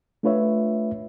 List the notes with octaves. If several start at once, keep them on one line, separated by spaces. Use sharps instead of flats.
A3 D4 F4 B4 C#5 E5